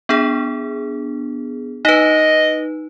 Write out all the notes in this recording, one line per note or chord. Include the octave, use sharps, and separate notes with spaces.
B3 D4 G#4
D#4 B4 D#5